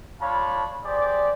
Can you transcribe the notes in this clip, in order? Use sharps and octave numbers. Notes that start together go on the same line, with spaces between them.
D4 F4 C#5 F5 A5 B5
G4 G#4 C5 D5